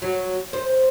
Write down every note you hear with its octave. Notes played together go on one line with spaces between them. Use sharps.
F#3
C5